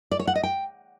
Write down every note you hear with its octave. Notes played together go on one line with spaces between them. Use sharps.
D5
C#5
F#5
D#5
G5